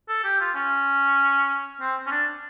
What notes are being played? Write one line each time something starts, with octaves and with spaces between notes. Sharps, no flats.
A4
G4
F4
C#4
C4
C#4
D4